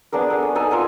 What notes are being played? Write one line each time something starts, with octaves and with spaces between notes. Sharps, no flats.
B3 D4 G#4 A#4
A4 G#5
C#5
D#4 A4 G#5
F4 A4 A#4 G#5